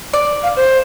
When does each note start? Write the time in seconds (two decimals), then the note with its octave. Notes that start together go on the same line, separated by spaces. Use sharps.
0.13 D5
0.42 F5
0.56 C5